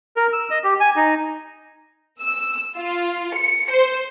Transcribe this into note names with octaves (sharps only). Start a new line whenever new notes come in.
A#4
E6
D#5
G4
G#5
D#4
E6
F4
C#7
C5